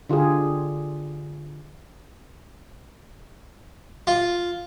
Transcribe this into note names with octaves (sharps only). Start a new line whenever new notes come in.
D3 F4 G4 G#4
F4